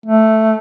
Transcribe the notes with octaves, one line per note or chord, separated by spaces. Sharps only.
A3